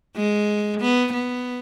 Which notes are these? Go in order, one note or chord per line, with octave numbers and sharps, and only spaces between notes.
G#3
B3
B3